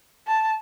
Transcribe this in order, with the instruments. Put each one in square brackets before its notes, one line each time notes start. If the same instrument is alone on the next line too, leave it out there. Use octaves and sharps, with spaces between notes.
[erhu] A5